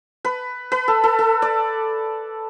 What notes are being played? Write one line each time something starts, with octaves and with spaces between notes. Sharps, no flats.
B4
B4
A4
A4
A4
D5